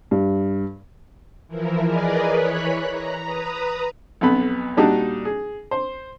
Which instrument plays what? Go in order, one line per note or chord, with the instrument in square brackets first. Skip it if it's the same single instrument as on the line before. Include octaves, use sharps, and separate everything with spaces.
[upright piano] G2
[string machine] E3 F3 E4 A#4
G#4 A#4 B4 D5 D#5 G#5
E3 C#5 B5 F#6
A#5
B4 A#5 D#6
[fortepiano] B1 F2 B3 B5
A#2 G3 D4 D#4 F#4
G#4
C5